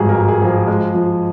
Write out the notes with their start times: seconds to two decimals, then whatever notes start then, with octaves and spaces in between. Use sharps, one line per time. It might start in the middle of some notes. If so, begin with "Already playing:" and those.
Already playing: G#1 G2 F3 G#3 G#4
0.09 A#4
0.15 G#3
0.28 G#4
0.42 F3
0.48 G#4
0.67 G#3
0.94 F3